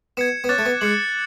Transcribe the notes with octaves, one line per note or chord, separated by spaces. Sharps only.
B3 G#6 C#7 E7
B3
C#4 D6 F#6 A6 E7
A3
B3
G#3 F#6 C#7 F#7